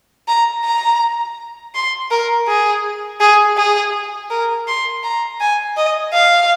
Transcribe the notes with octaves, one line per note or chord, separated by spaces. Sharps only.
A#5
A#5
C6
A#4
G#4
G#4
G#4
A#4
C6
A#5
G#5
D#5
F5